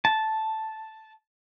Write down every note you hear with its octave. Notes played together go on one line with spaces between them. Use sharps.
A5